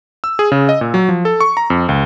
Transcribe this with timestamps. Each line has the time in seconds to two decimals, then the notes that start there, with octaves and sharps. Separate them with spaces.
0.24 E6
0.39 G#4
0.52 C#3
0.69 D#5
0.81 A#2
0.94 F#3
1.09 F3
1.25 A4
1.40 C#6
1.57 A#5
1.70 F2
1.89 C#2